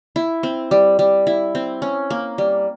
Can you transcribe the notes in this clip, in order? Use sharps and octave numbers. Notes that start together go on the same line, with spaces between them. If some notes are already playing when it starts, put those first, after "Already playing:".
E4
C4
G3
G3
E4
C4
C#4
A#3
G3